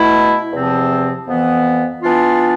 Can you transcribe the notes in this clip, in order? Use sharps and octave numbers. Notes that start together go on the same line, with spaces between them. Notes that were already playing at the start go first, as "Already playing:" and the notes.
Already playing: B2 A3 E4
E2 C3 F3 C4
F2 E3 B3
E3 B3 D4 F4